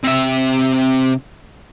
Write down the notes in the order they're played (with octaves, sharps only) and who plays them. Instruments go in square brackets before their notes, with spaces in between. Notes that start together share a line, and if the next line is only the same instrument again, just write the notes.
[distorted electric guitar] C3 E5